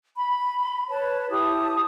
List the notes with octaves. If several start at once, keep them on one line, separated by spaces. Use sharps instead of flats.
B5
B4 C#5 A5
E4 G4 A5 D#6